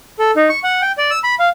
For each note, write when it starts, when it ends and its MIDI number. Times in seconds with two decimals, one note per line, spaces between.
0.19 0.31 69
0.36 0.49 63
0.49 0.59 85
0.64 0.82 78
0.82 0.92 79
0.98 1.11 74
1.11 1.19 88
1.24 1.35 83
1.39 1.49 77